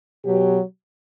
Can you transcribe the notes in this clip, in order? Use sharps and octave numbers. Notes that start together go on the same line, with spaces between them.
B2 F#3 G4